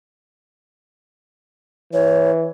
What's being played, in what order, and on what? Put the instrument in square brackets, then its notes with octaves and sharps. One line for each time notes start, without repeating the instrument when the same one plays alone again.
[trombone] E3 [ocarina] C#5